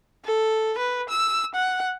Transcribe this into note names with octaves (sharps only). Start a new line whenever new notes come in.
A4
B4
E6
F#5